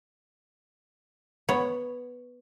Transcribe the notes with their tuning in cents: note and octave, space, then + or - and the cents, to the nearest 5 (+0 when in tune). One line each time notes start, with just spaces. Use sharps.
B3 +0 C#5 +0